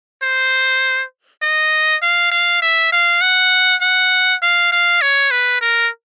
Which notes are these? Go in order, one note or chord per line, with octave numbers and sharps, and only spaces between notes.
C5
D#5
F5
F5
E5
F5
F#5
F#5
F5
F5
C#5
B4
A#4